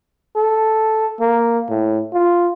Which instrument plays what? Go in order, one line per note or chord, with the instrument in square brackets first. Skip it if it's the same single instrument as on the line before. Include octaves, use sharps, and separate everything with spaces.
[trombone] A4
A#3
A2
F4